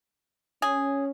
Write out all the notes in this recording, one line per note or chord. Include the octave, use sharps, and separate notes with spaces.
C#4 G#4